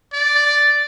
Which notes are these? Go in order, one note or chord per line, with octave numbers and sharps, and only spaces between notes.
D5